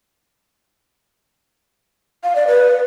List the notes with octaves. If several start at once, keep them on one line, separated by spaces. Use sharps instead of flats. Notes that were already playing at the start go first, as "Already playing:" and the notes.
F5
D5
B4